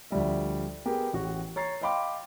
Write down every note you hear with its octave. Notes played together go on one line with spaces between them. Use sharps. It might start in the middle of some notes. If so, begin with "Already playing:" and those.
D2 F3 G3 E5
B3 G4 G#4 A#4
A1 F#4
C#5 A#5 A6 C7
D#5 F5 G5 B5 C6 D6